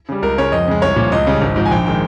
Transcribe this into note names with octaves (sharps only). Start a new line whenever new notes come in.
C#3 G3
C#2 A#4
C#3 G#3 C#5
F2 D#5
C#3 G#3
C2 C#5
A#2 F3
C#2 D#5
C#3 G3
G#1
G#2 F3
G#5
A#1 G5
D#3 G#3 G5